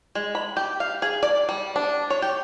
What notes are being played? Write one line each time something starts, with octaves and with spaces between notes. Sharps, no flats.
G#3
B5
G4
F5
G#4
D5
G3
D4
C#5
G4